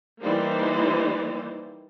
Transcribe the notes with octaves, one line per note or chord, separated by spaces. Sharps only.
E3 G3 A#3 D#4 C5 D5